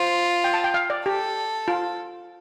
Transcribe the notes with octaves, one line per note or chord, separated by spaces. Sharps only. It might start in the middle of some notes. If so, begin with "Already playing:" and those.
Already playing: F4 C5
G5
A5
G5
F5
D5
G4 A4
F4